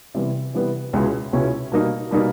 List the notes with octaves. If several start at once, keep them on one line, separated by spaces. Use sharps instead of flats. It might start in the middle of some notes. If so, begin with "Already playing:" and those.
C3 E3 G3 B3
C3 E3 G3 B3
C#2 B2 G#3 C#4 E4
C#2 B2 G#3 C#4 E4
B2 G3 A#3 D#4
B2 G3 A#3 D#4